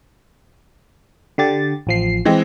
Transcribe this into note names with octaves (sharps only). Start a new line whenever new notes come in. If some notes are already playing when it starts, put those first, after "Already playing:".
D3 G4 A6
A1 F3 C7
E3 G#3 C4